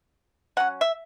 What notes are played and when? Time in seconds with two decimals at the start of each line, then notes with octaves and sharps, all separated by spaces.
0.57 F#3 C#4 F#5
0.81 E5